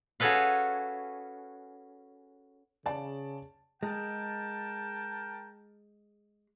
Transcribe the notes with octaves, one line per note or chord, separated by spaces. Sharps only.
C#4 F#4 G#4 A4 B4 F5
C#3 D5 A5
G#3 A#4 G5 A5